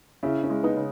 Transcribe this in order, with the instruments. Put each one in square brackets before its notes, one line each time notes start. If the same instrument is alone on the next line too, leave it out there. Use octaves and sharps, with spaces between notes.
[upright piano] C#3 [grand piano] C#4 E4
[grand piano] C#4 E4
[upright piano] G#3
[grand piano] B3 D#4
[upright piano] C#3